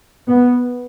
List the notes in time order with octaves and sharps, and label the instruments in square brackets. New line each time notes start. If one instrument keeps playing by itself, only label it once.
[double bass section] B3